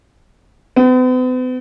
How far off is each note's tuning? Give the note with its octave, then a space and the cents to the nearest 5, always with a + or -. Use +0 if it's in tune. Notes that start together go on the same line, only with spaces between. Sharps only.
B3 +45